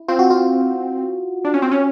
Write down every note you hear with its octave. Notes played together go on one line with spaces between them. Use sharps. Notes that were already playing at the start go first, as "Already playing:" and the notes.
Already playing: E4
C4 F4
F#4
F4
D4
C#4
C4
C#4